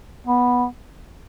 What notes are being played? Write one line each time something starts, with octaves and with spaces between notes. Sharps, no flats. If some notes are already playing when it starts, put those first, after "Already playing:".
B3